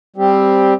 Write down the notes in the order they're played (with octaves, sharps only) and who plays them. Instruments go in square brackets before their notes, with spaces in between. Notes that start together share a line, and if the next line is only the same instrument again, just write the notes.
[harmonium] G3 C4 G4